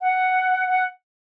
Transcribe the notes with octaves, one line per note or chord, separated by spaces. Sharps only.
F#5
F#5